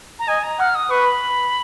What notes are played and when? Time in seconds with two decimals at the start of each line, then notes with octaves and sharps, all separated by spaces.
0.19 A#5
0.28 D#5 G#5
0.44 A#5
0.59 F#5 F6
0.75 D#6
0.91 B4 C#6
1.05 B5